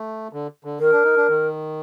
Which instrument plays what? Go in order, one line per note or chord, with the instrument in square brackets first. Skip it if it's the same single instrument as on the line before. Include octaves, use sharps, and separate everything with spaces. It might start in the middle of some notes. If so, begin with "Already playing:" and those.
Already playing: [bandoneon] A3
D3
D3
[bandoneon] D#3 [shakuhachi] A#4
[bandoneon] D4
D#4
D4
D#3